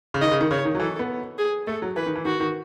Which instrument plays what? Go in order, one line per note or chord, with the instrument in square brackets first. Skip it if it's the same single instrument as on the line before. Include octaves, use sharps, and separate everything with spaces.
[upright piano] C#3
[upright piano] D#3 [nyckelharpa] D#5
[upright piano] C#3
D#3
[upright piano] C#3 [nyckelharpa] C#5
[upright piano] D#3
F#3
[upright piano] E3 [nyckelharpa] A4
[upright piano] B3
[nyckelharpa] G#4
[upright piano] A3 [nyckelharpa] A4
[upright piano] F#3
[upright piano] E3 [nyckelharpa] B4
[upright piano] D#3
E3
[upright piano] D#3 [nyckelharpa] F#4
[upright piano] D#3